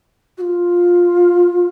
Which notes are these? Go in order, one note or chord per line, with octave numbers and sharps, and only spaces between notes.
F#4
F4